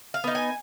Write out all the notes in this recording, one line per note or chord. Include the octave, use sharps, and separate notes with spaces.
F5
B3 D#4
G#5